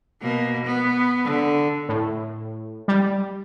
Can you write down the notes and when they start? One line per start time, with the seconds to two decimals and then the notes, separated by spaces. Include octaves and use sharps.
0.22 B2 A#3
0.65 B3
1.24 D3
1.89 A2
2.88 G3